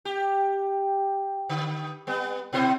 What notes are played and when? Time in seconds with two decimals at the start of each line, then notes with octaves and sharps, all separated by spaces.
0.05 G4
1.49 D3
2.07 G3 B3
2.53 B2 E4 C5